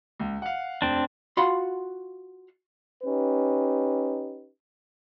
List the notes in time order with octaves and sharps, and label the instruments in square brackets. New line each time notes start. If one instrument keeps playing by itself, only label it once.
[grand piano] C#2
F5 F#5
[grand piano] F1 [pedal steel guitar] C4 D4
[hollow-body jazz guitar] F4 F#4 F5 F#5 B5 C6
[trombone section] C#4 D#4 G4 B4